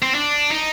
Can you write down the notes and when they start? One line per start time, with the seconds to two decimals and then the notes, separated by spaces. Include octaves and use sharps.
0.02 C4
0.15 D4
0.51 D#4